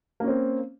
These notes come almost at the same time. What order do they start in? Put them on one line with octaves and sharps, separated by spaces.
A#3 C#4 C4